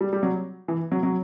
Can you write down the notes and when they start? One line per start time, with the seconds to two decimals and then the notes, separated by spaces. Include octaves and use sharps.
0.01 G3
0.13 G3
0.23 F#3
0.68 E3
0.92 F#3
1.03 F#3